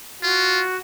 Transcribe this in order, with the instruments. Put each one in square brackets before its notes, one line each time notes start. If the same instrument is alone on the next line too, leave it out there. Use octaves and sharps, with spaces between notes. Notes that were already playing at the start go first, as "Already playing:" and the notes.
[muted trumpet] F4 [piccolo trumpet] F#4